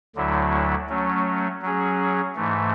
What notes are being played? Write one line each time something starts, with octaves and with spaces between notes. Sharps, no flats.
D2 D3 F#3 A3 E4
F#3 A3 C#4
F#3 C#4 G#4
G#2 E3 A3